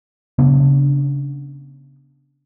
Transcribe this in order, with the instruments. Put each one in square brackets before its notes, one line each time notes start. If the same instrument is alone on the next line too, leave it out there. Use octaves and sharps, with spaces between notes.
[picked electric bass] C#3 B3 D4